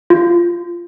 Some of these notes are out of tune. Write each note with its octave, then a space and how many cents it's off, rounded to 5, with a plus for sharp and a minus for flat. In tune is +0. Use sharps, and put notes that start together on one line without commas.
F4 -10